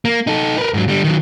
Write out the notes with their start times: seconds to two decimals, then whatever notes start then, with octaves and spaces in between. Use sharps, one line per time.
0.05 A#3
0.27 D#4 A4
0.58 A#4 B4
0.74 G#2 F#3
0.88 D3 G3
1.04 D#3 F#3